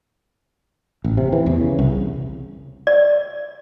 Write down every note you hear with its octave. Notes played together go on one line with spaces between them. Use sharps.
A1
C3
E3
E2
C#3
C2
D5